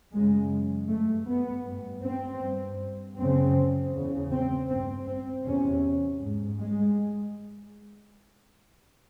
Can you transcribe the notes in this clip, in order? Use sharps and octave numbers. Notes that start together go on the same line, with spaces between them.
F#2 C#3 G#3
G2 A3
B3
G2
C4
G2
F#2 C#3 C4
E2 C#3
C4
G2 C4
C4
E2 C3 C#4
G#2
G#3